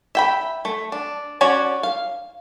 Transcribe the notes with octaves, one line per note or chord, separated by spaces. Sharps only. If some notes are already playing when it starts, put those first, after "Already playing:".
E5 G5 B5
A3
D4
C#4 F#4 C#5 D5
F5